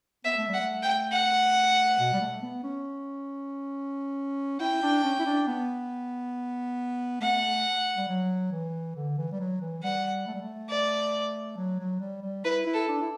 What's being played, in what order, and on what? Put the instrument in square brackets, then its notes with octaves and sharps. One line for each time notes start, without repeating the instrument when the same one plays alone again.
[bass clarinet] B3 [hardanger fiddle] E5
[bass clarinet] A3
[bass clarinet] G3 [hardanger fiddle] F#5
[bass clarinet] A3
[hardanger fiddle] G5
F#5
[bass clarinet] B2
G3
A3
B3
C#4
[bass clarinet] E4 [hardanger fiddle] G5
[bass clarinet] D4
C#4
E4
D4
B3
[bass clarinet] A3 [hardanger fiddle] F#5
[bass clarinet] G3
F#3
E3
D3
E3
G3
F#3
E3
[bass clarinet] G3 [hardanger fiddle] F#5
[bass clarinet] A3
G3
A3
[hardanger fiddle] D5
[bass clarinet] F#3
F#3
G3
G3
[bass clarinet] E4 [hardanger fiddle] B4
[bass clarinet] E4
[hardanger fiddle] A4
[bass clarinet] D4
E4